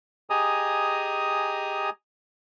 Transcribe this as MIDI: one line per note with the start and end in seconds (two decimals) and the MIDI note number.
0.30 1.90 67
0.30 1.90 68
0.30 1.90 75
0.30 1.90 80
0.30 1.90 82
0.30 1.90 87